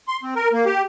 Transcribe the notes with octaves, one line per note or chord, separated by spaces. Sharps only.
C6
C4
A#4
A#3
G4